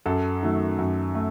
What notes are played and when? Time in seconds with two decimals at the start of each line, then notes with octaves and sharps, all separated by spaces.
0.06 F#2 A4
0.43 D#3 F#3 A3
0.78 F#2
1.15 A3